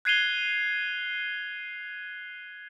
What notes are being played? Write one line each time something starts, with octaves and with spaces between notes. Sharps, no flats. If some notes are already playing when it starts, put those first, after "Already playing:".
F#6 G#6 C7 D#7 F7 G7